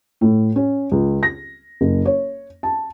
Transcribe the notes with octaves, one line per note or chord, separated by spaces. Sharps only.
A2
C#4
C#2
A#6
F#1
C#5
A5